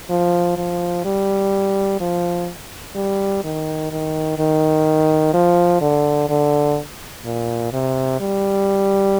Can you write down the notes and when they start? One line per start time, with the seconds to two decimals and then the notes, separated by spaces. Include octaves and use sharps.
0.10 F3
0.57 F3
1.05 G3
2.00 F3
2.95 G3
3.44 D#3
3.92 D#3
4.38 D#3
5.34 F3
5.81 D3
6.29 D3
7.25 A#2
7.73 C3
8.20 G3